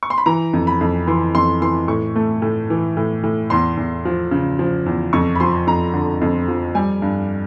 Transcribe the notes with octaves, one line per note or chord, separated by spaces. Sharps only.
C#6
C6
B5
E3 A#5
F2
B5
F2
E3 C6
F2 C6
E3 C6
A2 C#6
A3
A2
E3
A2
A2
E2 C6
E2
F3
C#3
F3
E2
F2 C#6
B5
F3 C6
F2 A#5
D3
F2
F3
G3 G#5
G2